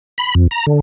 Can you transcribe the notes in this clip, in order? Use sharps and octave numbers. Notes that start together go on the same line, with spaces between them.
B5
F2
A#5
D3